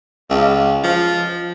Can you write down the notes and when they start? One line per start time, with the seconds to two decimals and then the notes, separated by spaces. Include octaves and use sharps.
0.30 C#2
0.84 F3